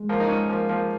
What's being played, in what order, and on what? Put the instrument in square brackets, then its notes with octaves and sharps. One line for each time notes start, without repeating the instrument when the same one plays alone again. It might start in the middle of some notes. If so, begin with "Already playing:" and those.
Already playing: [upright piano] G#3
[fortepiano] F3 A#3
D#4
G#3 C#4
F3 A#3
F3 A#3